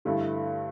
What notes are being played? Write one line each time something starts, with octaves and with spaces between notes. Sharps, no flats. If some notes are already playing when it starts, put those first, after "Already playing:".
G2 D3 A3 E4